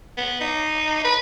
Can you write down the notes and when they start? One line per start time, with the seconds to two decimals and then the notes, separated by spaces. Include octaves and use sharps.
0.17 B3
0.40 D#4
1.04 B4